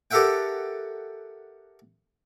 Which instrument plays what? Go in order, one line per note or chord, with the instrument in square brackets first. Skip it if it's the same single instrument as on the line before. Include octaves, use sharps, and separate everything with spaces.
[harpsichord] G4 A4 A#4 E5 F#5 G5